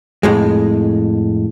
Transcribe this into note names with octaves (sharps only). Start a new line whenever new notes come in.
F2 A2 G#3